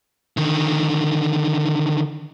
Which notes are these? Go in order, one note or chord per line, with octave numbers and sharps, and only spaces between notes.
D3 D#3